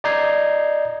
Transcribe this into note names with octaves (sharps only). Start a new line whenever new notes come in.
D5 D#5 A#5 G6 G#6 C7